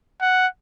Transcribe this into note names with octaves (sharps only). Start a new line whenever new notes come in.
F#5